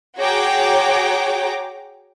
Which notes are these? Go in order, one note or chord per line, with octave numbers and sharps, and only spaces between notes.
F#4 G#4 C#5 G5 A#5 D6